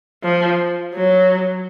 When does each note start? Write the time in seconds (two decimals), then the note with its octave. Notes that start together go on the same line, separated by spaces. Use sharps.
0.23 F3
0.94 F#3